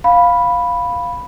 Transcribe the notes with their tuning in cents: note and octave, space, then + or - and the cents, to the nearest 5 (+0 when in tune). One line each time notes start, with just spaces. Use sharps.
F5 +10 B5 +0